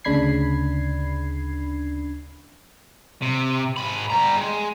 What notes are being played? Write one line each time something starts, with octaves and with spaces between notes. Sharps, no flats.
D2 C#3 D4 B5 G#6 C7
C3
G#2 B5
G3 A#5
G#3